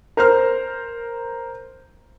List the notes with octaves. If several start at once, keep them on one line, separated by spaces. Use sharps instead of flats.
A#4 C5 F6